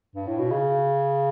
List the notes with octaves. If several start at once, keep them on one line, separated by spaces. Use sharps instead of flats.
G2
A2
B2
C#3